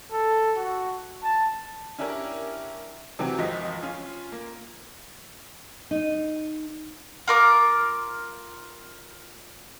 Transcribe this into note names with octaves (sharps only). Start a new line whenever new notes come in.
A4
F#4
A5
C#4 D4 E4 G4 A#4
C3 E3 F#3 C4 G4
F#1 C#2 F3 F4 D#5 B6
C#4 F4
A#3
D#4
F4 A#4 D6